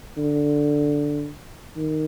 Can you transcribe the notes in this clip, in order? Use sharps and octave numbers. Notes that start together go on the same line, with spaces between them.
D3
D#3